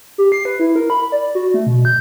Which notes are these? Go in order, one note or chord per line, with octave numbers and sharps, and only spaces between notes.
G4
C7
B4
E4
A#4
B5
D5
F#4
A3
B2
G6